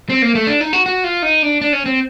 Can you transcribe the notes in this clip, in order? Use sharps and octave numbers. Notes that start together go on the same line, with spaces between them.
C4
A#3
A3
D4
D#4
F#4
F#4
F4
D#4
D4
D4
C#4
C4